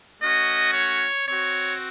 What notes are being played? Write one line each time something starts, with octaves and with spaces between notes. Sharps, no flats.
A3 C#4 F#4 D#5
C#5
C4 F#4 C#5